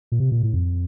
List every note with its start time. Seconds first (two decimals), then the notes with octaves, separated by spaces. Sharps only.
0.12 A#2
0.20 C3
0.32 A#2
0.43 A2
0.54 F2